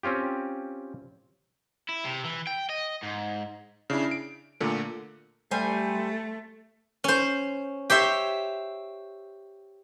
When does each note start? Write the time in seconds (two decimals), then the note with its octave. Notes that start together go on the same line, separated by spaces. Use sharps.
0.03 C4 C#4 F4 G4
1.89 E4
2.05 C3
2.24 E3
2.47 G5
2.69 D#5
3.03 G#2
3.90 C#3 D4 E4
4.11 D7
4.60 A#2 D3 A3 A#3
5.51 G3 A3 C5 G#5
7.04 C#4 C5
7.90 G4 C5 C#5 E5